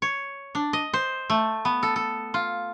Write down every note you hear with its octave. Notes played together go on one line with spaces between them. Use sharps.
C#5
D4
D#5
C5
A3
B3
A4
A4
F4